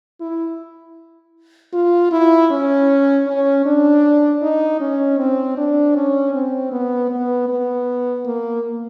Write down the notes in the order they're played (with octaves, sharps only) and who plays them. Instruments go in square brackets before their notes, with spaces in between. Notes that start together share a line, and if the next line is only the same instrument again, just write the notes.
[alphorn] E4
F4
E4
C#4
C#4
D4
D#4
C#4
C4
D4
C#4
C4
B3
B3
B3
A#3